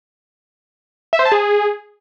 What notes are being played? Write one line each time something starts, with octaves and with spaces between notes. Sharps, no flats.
E5
C5
A5
G#4